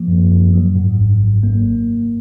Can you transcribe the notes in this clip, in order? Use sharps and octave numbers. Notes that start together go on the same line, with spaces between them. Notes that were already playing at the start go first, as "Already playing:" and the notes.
Already playing: F3 A#3
F#2
F#2
F#3
G#2
G#1
G#1
A#3